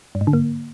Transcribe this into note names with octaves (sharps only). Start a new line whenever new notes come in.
G2
G#2
D3
A#3